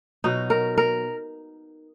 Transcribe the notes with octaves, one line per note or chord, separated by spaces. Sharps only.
B2 F#3 D#4
A#4
A#4